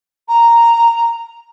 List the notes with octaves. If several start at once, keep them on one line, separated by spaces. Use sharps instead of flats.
A#5